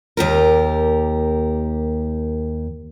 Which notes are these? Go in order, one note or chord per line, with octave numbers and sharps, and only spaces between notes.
D#2 G4 A#4